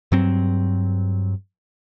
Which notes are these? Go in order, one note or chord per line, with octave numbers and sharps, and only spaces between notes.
G2 F#3 C4